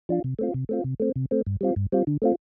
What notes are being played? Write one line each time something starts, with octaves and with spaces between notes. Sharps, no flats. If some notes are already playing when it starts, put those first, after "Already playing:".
F3 D4 F4
C3
A3 C4 F4
C3
A3 C4 F4
C3
A3 C4
C3
A3 C4
G2
G3 C4 F4
G2
G3 C4 F4
D3
A3 C4 F4